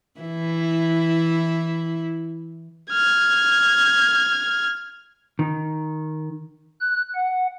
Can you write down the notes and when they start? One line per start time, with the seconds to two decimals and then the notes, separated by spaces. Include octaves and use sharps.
0.20 E3 E4
2.92 F6 G#6
5.39 D#3
6.81 F#6
7.15 F#5